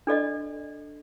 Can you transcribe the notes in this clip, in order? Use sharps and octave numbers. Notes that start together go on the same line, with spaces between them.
D4 A4 D5 D#5